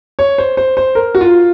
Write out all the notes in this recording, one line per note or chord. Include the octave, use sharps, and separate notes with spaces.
C#5
C5
C5
C5
A#4
F#4
F4